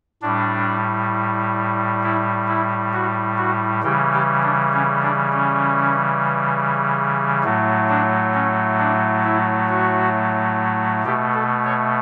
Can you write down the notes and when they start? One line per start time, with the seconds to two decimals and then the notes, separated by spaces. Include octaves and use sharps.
0.22 A2 G3 D4
2.03 E4
2.48 E4
2.93 F#4
3.38 F#4
3.83 C#3 E3 G3 G4
4.13 G4
4.43 D4
4.73 C#4
5.03 D4
5.33 C#4
7.44 A2 F#3 A3
7.89 D4
8.34 C#4
8.79 D4
9.24 E4
9.69 F#4
11.04 B2 A3 G4
11.34 A4
11.65 C#5